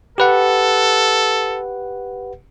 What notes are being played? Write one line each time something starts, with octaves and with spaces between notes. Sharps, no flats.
G4 A4 B4 F#5